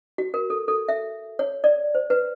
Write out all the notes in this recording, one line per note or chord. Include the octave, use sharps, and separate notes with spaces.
F#4
A#4
A4
A4
E5
C#5
D5
C5
B4